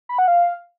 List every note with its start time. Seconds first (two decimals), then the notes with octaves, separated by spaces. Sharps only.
0.09 B5
0.18 F#5
0.28 F5